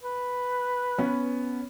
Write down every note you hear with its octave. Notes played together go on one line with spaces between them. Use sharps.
B4
B3 C#4